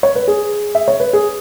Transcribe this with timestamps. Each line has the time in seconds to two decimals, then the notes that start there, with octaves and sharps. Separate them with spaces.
0.03 C#5
0.15 B4
0.28 G#4
0.75 E5
0.88 C#5
1.00 B4
1.13 G#4